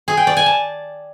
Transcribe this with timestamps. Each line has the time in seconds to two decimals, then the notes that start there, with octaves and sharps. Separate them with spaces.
0.08 G#4
0.17 G5
0.27 D5
0.37 G#5
0.46 A5